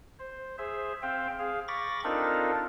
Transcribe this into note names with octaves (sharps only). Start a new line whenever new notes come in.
C5
G#4 C5 E5
C4 C5 F5 G5
G#4 F5
B5 C#6 D6 A6 A#6
C4 D4 D#4 F4 A4 A#4